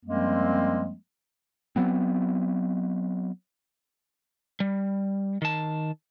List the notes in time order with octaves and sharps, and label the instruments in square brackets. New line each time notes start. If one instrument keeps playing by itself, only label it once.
[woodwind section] F#2 F3 G3 G#3 A#3 C4
[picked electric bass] F#3 B3 C4
[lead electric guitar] G3
D#3 A5